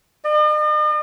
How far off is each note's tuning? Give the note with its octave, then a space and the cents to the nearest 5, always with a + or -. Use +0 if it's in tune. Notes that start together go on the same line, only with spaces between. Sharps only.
D#5 -45